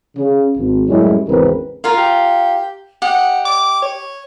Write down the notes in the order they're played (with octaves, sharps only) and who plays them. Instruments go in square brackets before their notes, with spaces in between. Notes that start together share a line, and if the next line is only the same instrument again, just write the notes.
[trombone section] C#3
G#1
F#2 A2 G3 G#3 C#4 E4
G#1 E2 C#3 C4 A#4 B4
[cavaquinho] F4 A#4 F5
[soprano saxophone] G4
[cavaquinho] G4 D#5 [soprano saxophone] F#5
[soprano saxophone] D6
C#5